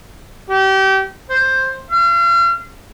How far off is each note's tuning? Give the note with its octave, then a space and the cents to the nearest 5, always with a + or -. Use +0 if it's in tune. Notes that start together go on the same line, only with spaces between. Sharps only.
G4 -30
C5 +10
F5 -40